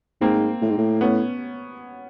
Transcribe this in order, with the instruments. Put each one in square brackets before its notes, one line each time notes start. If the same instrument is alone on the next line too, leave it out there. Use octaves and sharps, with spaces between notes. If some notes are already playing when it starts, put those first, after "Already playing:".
[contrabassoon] G#2 [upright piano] A#3 C4
[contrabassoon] A2
G#2
A2
[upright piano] B3 C#4